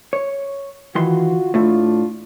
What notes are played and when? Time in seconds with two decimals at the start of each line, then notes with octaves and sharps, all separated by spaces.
0.13 C#5
0.95 D#3 E3 F4 F#4 C6
1.54 A2 A3 D4 F4